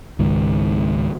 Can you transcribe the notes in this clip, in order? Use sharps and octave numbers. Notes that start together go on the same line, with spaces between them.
C#2 G#2 D#3